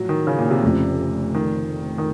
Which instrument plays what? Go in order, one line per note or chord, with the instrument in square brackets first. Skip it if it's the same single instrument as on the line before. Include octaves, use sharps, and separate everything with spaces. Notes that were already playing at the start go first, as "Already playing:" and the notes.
Already playing: [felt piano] A2 F3 [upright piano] F#3
[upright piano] D#3
C#3
A#2
C3
[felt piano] F1 F2 C#3
[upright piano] D#3
D#3